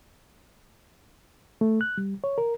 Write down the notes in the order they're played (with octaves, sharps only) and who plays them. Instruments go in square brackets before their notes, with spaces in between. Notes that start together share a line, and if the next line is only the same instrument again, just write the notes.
[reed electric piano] A3
F#6
G3
C#5
A#4